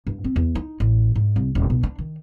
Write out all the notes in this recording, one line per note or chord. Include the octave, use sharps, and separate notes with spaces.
G2
C4
E2
D#4
A1
G#2
C2
D#1
B1
D4
D#3